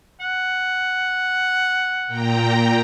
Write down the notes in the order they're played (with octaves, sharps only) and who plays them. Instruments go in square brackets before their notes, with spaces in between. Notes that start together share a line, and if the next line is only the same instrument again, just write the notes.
[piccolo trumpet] F#5
[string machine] A#2 G5 A#5